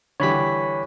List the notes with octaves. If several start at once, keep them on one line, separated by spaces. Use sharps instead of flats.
D3 E3 G3 C#5 B5 B6